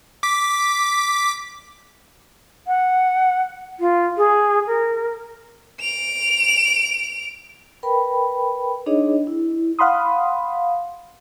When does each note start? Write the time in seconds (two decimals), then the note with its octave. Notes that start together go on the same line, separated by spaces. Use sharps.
0.23 D6 B6
2.67 F#5
3.80 F4
4.17 G#4
4.67 A#4
5.80 D7 F7
7.83 A#4 B4 G5 B5
8.86 D4 D#4 G#4 C#5 D#5
9.27 E4
9.79 F5 F#5 B5 C6 D#6